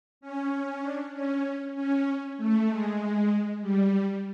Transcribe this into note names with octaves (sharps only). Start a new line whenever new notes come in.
C#4
D4
C#4
C#4
A3
G#3
G3
G3